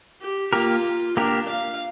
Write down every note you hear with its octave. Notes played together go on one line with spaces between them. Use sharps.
G4
A#3 F4 G4 A#4
A#3 D4 G4 A#4
F5